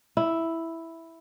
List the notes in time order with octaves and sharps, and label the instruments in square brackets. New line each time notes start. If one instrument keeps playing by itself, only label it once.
[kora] E4